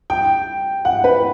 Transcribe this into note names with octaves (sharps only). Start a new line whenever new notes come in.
G5
F#5
B4